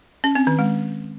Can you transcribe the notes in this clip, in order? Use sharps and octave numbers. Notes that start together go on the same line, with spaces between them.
C#4
C4
D#3
G#3